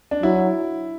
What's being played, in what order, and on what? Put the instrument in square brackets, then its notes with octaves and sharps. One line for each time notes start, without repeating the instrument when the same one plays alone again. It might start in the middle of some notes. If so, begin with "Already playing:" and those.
[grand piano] D4
[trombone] F#3 [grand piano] E4